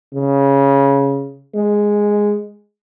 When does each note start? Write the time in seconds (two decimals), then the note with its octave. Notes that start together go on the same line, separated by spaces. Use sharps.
0.15 C#3
1.55 G#3